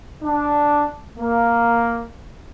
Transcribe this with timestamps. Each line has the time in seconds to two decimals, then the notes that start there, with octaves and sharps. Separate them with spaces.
0.23 D4
1.18 A#3